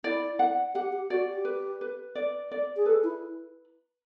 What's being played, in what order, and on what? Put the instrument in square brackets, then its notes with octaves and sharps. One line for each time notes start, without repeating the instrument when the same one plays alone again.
[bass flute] E4 [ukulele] D5
[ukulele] F#5
[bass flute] G4 [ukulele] F#5
[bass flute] G4
[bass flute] F#4 [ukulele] D5
[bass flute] G4
[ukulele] B4
B4
D5
D5
[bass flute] G#4
[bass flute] A4 [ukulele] B4
[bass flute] E4